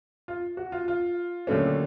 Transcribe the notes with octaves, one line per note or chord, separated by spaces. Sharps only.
F4
F#4
F4
F4
D#2 D3 F#3 A3 C#4